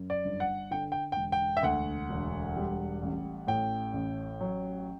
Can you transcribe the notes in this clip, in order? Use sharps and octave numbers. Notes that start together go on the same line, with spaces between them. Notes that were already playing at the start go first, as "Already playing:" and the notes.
Already playing: F#2
D5
G1
F#5
D3 G5
G5
E1 G5
G5
E5
D2 F#5
E1
G3
A1
A2 G5
A1
F#3